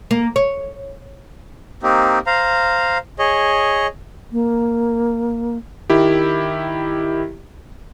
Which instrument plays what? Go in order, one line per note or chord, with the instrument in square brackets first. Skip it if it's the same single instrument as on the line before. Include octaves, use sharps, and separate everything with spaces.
[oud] A#3
C#5
[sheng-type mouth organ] A#3 C4 D#4 G4
C5 F5 A#5
G#4 C#5 D#5
[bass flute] A#3
[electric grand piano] D#3 E4 G4